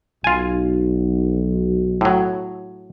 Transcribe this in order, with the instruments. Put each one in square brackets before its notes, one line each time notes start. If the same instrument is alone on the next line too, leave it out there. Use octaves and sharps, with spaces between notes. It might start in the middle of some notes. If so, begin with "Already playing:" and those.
[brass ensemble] B1 [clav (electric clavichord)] F4 G#5
[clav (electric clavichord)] A2 F#3